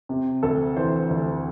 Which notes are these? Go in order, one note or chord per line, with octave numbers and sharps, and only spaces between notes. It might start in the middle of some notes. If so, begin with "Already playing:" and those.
C3
D2 A4
E3 C5
D2